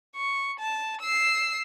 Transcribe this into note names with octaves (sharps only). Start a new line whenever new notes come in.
C#6
A5
E6 C7